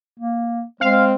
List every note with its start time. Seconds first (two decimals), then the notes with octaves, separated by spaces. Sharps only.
0.20 A#3
0.81 G#3 C4 F5